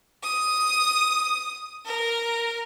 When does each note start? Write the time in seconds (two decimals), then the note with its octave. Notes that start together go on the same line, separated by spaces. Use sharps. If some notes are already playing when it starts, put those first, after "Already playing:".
0.23 D#6
1.86 A#4